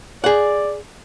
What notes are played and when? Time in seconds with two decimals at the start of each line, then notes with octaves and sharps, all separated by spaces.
0.24 G#4 D5 F#5